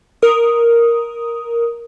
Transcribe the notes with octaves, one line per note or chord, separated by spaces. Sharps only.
A#4 D#6